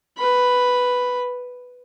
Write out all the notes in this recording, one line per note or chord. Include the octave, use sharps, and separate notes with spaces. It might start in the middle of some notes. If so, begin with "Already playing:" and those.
B4 B5